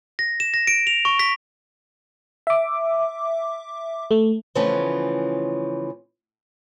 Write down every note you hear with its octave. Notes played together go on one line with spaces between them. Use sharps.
A#6
E7
A#6
D7
F7
C#6
B6
E5 D6
A3
C#3 E3 F3 A3 B3 C#4